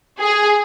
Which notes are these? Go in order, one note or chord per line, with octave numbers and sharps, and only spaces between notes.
G#4